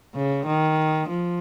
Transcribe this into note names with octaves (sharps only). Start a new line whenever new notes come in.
C#3
D#3
F3